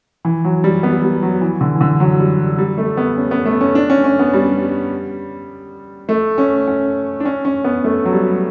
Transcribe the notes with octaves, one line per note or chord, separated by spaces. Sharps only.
E3
F#3
G3
B3
G3
F#3
E3
D3
E3
D3
F#3
G3
G3
A3
B3
C#4
B3
A3
C#4
D4
C#4
C#4
B3
G3
A3
C#4
C#4
D4
C#4
C#4
B3
A3
F#3
G3